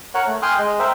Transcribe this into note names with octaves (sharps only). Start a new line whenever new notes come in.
A#4 C#5 F#5
A3
G5 G#5 C6 D#6 F6 F#6
G#3 D#5
A#4 C5 E5 G5